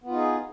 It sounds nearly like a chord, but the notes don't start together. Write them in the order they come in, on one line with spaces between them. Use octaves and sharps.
B3 F4 D#4 G#4